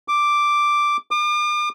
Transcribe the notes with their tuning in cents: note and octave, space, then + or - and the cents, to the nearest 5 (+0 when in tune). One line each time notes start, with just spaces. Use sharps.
D6 +0
D6 +40